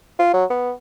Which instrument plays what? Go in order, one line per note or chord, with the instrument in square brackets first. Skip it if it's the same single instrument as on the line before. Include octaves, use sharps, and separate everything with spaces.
[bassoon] F4
F#3
B3